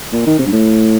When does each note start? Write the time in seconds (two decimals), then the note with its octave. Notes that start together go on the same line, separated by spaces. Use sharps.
0.13 A#2
0.27 D#3
0.39 C3
0.46 G2
0.52 A2